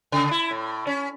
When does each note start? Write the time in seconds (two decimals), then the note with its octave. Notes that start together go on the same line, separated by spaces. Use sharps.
0.12 C#3
0.31 E4
0.51 A2
0.87 C#4